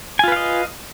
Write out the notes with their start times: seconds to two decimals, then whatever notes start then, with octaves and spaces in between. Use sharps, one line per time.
0.19 G#5
0.24 F4
0.28 B4
0.32 F5
0.36 D#5